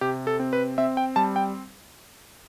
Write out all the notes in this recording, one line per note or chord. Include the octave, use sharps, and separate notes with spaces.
C3 G4
A4
C4
B4
C4 E5
G5
G3 A5
G5